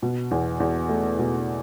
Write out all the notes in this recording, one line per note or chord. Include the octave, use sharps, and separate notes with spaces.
B2
E2
E2
A3
B2